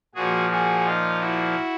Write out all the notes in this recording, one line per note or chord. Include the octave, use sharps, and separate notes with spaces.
A#2 F3 F#4 G#4
F#4 G#4
D#4 F4
E4 F#4